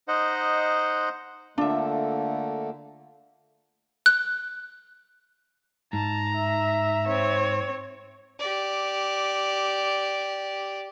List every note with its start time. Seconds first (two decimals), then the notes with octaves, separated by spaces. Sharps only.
0.08 D#4 C5 D#5 F#5
1.58 D3 A3 A#3 D4 F4 E5
4.06 F#6
5.93 G#2 A5 A#5
6.36 E5
7.07 C4 C#5
8.39 G4 D5